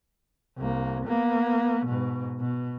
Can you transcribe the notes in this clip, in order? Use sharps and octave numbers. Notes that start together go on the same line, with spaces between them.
C2 A#3
A#3 B3
G#2 B2
B2